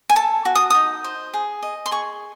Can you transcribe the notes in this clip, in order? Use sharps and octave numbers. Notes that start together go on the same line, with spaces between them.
G#5
A4 A5
F#4
D#6
D#4 D#6
C5
G#4
D#5
C6
G#4 C#6